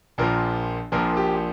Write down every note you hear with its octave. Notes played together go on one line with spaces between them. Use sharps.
A#1 A#2 F3 A#4
A#1 A#2 F3 A#4
G4